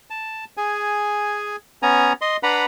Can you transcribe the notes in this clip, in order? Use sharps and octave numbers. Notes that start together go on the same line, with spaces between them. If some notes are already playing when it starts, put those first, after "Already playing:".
A5
G#4 G#5
B3 C#4 G#5 A#5
D#5 C6
D4 B4 F#5 A#5 B5